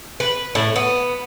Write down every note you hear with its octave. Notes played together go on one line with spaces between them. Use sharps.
B4
A2
B3